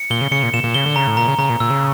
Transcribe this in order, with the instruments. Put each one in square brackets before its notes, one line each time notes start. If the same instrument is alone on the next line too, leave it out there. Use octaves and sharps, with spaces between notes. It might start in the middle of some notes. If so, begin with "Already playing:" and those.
Already playing: [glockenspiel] C#7
[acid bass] A#2 [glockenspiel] G7
[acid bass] C#3
[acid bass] C#3 [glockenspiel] C#7
[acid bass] A#2
[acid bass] A#2 [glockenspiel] E7
[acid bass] A#2
[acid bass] C#3 [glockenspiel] G7
[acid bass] D3
[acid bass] C#3 [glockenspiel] A#5
[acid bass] A2
[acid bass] A#2 [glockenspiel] A#5
[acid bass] C#3
[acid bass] C#3 [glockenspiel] A#5
[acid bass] A#2
[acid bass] A#2 [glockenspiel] E6
[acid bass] C#3